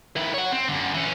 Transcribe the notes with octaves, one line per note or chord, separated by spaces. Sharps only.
D#3 E4
C#5 F#5
C4
F#2 D3
E3 C#4